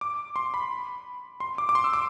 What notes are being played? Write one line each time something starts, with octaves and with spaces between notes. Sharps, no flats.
D6
C6
B5
C6
D6
D6
C6
E6
D6